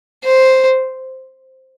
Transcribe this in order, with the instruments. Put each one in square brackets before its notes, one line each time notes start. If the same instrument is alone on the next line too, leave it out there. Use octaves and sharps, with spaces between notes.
[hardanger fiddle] C5